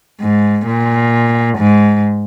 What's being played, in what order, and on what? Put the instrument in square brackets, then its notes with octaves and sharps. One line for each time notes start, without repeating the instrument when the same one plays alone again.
[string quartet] G#2
A#2
G#2